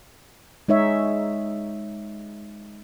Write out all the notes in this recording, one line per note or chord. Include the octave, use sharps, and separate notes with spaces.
G#3 D#4 C#5 E5